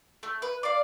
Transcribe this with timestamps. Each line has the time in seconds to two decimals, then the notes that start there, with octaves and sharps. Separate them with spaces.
0.23 A3
0.42 B4
0.63 D5 F5